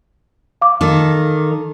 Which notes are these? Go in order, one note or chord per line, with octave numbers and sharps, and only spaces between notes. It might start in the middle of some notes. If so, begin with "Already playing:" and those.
F5 D6
D#3 A4